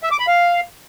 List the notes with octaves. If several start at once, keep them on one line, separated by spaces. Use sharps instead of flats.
E5
D6
B5
F5